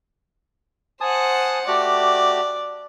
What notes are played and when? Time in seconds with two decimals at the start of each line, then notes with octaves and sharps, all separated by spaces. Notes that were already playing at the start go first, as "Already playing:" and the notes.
1.01 C5 F#5 G#5 A5 D#6
1.67 A3 F#4 G4 D5